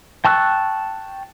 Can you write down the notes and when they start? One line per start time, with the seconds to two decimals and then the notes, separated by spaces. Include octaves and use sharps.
0.25 G5 A5 C#6 E6 F#6